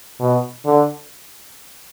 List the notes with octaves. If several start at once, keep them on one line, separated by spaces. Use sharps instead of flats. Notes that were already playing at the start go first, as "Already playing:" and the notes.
B2
D3